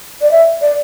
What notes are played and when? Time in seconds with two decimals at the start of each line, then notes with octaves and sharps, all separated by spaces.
0.22 D5
0.31 E5
0.62 D5